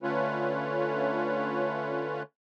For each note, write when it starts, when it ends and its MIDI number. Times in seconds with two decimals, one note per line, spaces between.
0.03 2.22 50
0.03 2.22 57
0.03 2.22 61
0.03 2.22 65
0.03 2.22 71
0.03 2.22 73